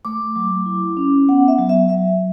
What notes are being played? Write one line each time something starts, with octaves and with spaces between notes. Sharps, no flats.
A3 D6
F#3
E4
C#4
B3 F#5
E5
F#3
E5
F#3 E5